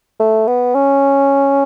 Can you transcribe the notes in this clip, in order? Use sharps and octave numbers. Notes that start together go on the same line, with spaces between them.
A3
B3
C#4